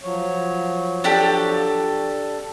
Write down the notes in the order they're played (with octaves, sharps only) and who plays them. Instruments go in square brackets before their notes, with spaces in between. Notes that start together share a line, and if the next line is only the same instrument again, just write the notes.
[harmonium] F3 F#3 C#5
[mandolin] D4 G4 A4